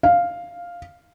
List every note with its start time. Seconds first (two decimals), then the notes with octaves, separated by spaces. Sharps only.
0.03 F5